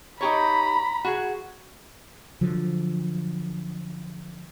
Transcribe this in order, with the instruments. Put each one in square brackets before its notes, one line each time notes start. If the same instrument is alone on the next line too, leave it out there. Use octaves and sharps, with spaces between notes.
[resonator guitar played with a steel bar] D#4 G4 C#5 [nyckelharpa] A#5 [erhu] B5
[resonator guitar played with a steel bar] F#4 G#4
[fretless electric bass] D3 F3 F#3